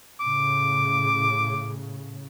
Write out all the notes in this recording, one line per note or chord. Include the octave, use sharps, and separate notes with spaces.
A2 C#3 D6